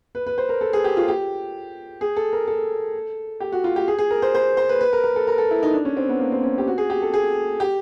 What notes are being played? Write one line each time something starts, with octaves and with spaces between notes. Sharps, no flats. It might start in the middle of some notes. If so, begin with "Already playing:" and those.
B4
B4
C5
A#4
A4
G#4
G4
F4
G4
G#4
A4
A#4
A4
G4
F#4
F4
G4
G#4
G#4
A#4
C5
C5
C5
B4
B4
A#4
A#4
A4
A#4
A4
E4
D#4
D4
C#4
C4
B3
A#3
C4
C#4
G4
F#4
G#4
G4
A4
G#4
G4